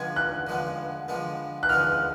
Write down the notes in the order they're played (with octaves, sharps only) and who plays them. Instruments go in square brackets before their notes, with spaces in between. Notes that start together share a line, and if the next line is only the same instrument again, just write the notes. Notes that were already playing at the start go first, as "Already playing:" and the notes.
Already playing: [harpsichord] D3 F3 G#3 B3 [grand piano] G#6
[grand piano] F#6
[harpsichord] D3 F3 G#3 B3
D3 F3 G#3 B3
[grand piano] F#6
[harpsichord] D3 F3 G#3 B3 [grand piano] F6